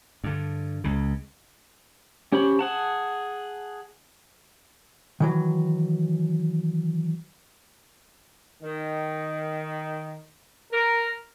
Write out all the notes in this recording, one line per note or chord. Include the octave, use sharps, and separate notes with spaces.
G2 D3
C#2 C#3
C#4 G4 C5 C#5 B5
G#4 F#5 A5
D#3 E3 F#3
D#3
A#4